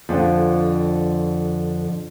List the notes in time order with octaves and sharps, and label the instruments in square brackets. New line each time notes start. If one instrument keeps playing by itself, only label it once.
[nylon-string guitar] F2 D3